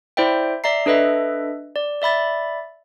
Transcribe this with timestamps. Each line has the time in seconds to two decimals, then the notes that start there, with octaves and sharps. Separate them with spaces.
0.17 E4 C5 D5 E5 G5
0.64 D5 E5 A#5 C7
0.86 D4 A4 B4 D#5 E5
1.76 D5
2.02 D5 E5 B5 A6